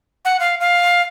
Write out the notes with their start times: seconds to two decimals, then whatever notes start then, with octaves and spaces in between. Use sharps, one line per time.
0.25 F#5
0.40 F5
0.60 F5